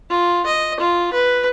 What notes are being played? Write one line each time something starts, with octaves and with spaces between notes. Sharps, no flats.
F4
D#5
F4
B4